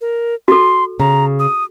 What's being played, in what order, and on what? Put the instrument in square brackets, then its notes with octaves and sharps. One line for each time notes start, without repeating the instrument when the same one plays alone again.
[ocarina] A#4
[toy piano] F#4 A4 [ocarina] C6
[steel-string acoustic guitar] C#3 [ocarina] A#5
[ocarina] D#6